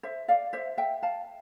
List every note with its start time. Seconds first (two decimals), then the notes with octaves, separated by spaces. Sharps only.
0.03 C5 E5
0.28 D5 F5
0.53 C5 E5
0.77 E5 G5
1.02 F5 A5